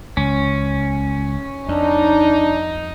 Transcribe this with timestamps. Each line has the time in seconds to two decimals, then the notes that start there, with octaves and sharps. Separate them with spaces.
0.17 C#2 C#4
1.68 F2 D4 D#4